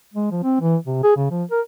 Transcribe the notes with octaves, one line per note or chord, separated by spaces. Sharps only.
G#3
F3
C4
E3
C3
G#4
C#3
F3
A#4